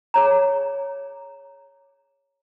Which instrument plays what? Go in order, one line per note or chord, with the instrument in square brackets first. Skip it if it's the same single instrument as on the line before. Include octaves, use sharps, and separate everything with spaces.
[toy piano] G#4 C#5 A#5